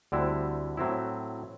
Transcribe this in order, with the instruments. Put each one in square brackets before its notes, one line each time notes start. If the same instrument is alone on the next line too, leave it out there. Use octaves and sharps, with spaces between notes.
[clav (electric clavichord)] D2 D3 G3 C4 E4
A2 F#3 C4 E4